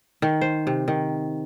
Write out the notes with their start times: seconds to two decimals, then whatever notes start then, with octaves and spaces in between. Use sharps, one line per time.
0.22 D#3
0.41 C5
0.67 C3
0.88 D#3